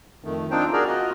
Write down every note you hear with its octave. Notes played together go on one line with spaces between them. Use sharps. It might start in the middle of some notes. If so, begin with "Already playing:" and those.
F2 D#3 A3
C4 D4 D#4 F4 C5 G5
F#4 G#4 A#4 D5 A#5
F4 F#4 D#5